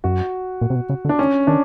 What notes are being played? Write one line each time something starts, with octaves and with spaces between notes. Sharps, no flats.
F#2 F#4
A#2
C3
B2
C#3
D3
D4
D#3 C#4
D#3 D4